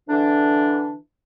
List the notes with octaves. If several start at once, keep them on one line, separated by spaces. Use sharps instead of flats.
D3 E3 D4